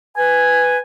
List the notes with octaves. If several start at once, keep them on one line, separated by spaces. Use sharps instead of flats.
B4 G#5